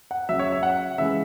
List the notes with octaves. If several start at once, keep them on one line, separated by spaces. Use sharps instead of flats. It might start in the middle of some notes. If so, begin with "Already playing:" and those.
F#5
C#3 F#3 E5
C#5
E5
F#5
C#3 E3 G#3 E5